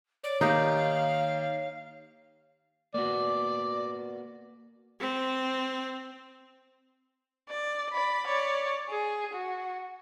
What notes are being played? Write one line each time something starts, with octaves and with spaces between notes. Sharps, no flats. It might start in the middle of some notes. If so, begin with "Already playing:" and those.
C#5 D5
D#3 A#3 D#4 G4 F5
A#3 B3 F#4 D5
C4
D5
D5 B5
C#5 D5
G#4
F#4